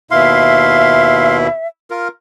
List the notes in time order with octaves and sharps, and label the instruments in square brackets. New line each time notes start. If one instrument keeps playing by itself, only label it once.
[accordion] D#2 B2 E4 [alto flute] E5 [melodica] F5 C6
[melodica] F4 A#4